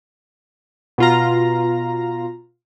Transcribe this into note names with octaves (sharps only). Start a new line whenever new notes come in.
B2 F4 A#5